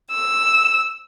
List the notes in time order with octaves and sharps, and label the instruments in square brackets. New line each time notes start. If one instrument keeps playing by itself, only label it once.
[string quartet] E6